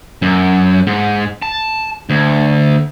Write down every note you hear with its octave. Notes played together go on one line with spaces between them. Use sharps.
F#2
G#2
A5
D2